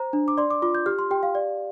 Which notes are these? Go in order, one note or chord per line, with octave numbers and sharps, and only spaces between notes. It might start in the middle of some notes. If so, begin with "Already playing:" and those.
Already playing: C5 A#5
D4
D6
D5 C6
D6
F4 D6
G6
G4 F6
C6
G4 G5
F5
D5